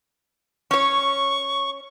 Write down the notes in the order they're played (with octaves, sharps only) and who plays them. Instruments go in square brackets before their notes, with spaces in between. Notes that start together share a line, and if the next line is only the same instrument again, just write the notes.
[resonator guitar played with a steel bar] C#4 C#5 [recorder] C#6